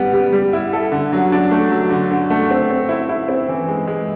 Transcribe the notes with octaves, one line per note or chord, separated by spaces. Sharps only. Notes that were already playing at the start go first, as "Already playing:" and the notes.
Already playing: G3 B3
G3
G3
E4
A4
D3
F#3
D4
A3
F#3
D3
D3
A3
C4
C4
E4
E4
C4
E3
G#3
G#3